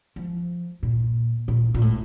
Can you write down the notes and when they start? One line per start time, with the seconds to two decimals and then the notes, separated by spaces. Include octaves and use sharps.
0.16 F3
0.83 A#2
1.48 A#2
1.74 A#2
1.81 A2